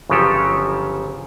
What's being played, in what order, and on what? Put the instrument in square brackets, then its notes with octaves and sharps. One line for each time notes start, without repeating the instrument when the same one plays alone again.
[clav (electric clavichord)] G1 C#3 F3 F#3 G4 A4